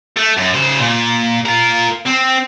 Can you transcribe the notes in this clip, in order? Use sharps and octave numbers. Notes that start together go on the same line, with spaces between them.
A3
F#2
C#3 C5
A#2
F4 A#4
C4